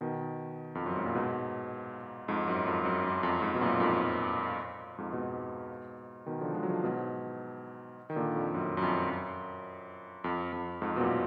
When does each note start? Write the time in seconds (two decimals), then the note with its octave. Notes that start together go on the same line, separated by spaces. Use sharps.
0.01 B2 D#3
0.75 F2
0.86 F#2
0.96 G#2
1.04 A#2
1.15 G#2 B2
2.28 F2 G#2
2.48 F#2
2.67 F2
2.85 F#2
3.04 F#2
3.23 F2
3.42 F2 G#2
3.55 B2
3.61 F#2 A#2
3.80 F2 G#2
4.98 F2 G#2
5.13 G#2 B2
6.26 B2 D#3
6.41 D3 F3
6.55 F3 G#3
6.63 F#3
6.69 D3 F3
6.84 G#2 B2
8.10 D#3
8.16 A#2 D3
8.36 F2
8.54 F#2
8.77 F#2
8.82 F2
9.10 F#2
10.24 F2
10.53 F2
10.82 F2 G#2
10.96 B2
11.00 F#2 A#2